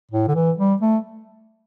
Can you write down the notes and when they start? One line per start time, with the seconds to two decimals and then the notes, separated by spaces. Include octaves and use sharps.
0.11 A2
0.27 D3
0.35 E3
0.58 G3
0.81 A3